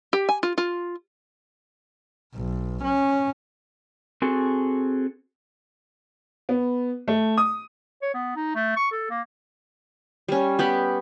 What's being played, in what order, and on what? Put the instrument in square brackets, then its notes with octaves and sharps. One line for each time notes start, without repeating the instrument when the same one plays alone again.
[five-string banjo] G4
G#5
F4
F4
[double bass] B1
C#4
[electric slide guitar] C4 F#4 G#4 A4
[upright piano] B3
A3
D#6
[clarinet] C#5
B3
D#4
A3
C#6
A4
A#3
[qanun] G3 C#4
B3 G4 B5